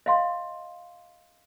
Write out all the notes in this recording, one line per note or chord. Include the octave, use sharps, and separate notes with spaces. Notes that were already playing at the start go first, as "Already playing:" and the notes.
D#5 F5 C6